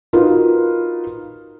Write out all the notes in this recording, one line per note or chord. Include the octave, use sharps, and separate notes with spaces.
D#4 F4 F#4 A#4 B4